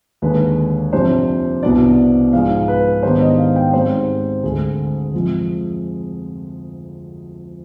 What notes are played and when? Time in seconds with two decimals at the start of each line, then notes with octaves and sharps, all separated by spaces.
0.22 D#2 D3 G#3 D4 B4
0.92 F2 C3 G3 D4 C5
1.63 C2 B2 B3 D4 D5
2.33 G#2 F3 G#3 F5
2.68 B4
3.03 G#2 D#3 G3 B3 D4 C5
3.21 D#5
3.38 F5
3.56 G5
3.73 G#2 G3 C4 C5
4.43 D2 D3 G#3 G#4
5.14 F2 C3 F3 G#3